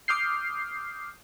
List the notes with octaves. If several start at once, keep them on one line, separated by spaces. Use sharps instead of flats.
D6 D#6 F6 G6 C7